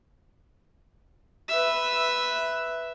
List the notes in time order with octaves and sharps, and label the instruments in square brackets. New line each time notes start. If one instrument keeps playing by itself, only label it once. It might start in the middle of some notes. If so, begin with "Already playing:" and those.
[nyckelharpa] B4 E5